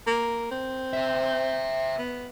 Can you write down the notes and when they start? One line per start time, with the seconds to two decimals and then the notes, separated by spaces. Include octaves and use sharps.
0.07 A#3
0.51 C4
0.93 C5 E5
1.98 B3